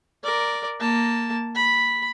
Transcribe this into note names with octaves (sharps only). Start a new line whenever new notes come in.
A#4 D5
A#3 A5
B5